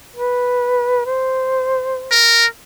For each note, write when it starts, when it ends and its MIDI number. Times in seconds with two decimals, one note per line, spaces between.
0.16 1.05 71
1.06 2.22 72
2.12 2.46 70